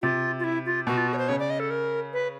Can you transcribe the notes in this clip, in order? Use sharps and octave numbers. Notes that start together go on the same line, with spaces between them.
C3 F4
F4
E4
F4
B2 F#4
F4
F#4
C#5
C5
C#3 C#5
D5
D#5
A4
A#4
B4